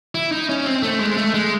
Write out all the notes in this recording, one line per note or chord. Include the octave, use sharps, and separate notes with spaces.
E4
D#4
C#4
C4
A3
G#3
A3
G#3